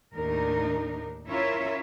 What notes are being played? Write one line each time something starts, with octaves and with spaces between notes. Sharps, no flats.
D#2 A2 D4 D#4 A#4
C#4 E4 F4 A#4 C#5 E5